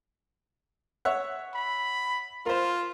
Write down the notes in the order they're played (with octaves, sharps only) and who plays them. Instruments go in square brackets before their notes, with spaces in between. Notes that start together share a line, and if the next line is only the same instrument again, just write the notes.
[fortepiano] C#5 E5 F#5
[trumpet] B5
[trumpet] F4 [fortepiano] A#4 C5